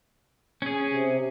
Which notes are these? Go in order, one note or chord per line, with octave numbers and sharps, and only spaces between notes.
C#4 G#4
C3